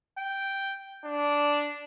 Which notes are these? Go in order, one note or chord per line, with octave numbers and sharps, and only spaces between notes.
G5
D4